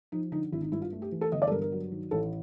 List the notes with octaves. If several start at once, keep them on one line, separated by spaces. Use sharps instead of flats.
F3 D#4
D3 D#4
G#1 E4
D#4
G2 E4
F4
A3
G4
E3
A4
G1 D#5
D5
A4
G2 A#4
A#4
F#3
D#3
A1 A4